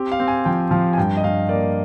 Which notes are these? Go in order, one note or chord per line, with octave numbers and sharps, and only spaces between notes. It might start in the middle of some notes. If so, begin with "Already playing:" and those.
Already playing: C4 G4
F5
C4
G#5
F3 G5
F3 F5
G#5
G2 G5
D#5
G2 F5
A#3 D5